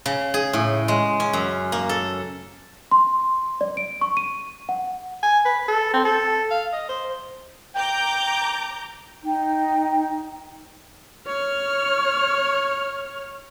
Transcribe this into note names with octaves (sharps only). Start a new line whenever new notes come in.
C#3
G#4
A2
G#3
C#4
F#2
A#3
A4
C6
D5
D7
C#6
D#7
F#5
G#5
B4
A4
C4
A4
F5
D#5
C5
G5 A#5 D6 G6
D#4 G5
C#5 F6